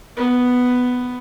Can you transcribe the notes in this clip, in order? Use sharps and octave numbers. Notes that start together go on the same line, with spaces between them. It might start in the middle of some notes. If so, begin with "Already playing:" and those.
B3